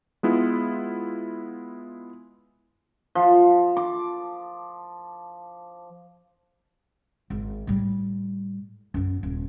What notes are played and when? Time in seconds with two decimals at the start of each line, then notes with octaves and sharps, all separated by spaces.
0.23 G#3 B3 E4 F4
3.15 F3
3.77 D6
7.30 G#1
7.67 A2 G3
8.94 F#2 B3
9.23 D#1